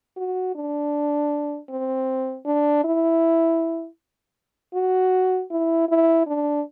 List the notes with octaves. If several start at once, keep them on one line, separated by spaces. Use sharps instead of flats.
F#4
D4
C4
D4
E4
F#4
E4
E4
D4